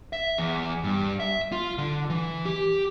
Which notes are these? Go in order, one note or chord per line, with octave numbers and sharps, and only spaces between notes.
E5
E2
G2
E5
F4
D3
E3
G4